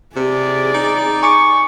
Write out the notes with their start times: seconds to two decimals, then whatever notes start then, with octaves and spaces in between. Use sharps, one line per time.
0.16 C3 G#4 D5
0.74 D#4
1.23 G#5 C#6 D6 C#7